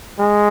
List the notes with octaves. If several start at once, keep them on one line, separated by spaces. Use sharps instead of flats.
G#3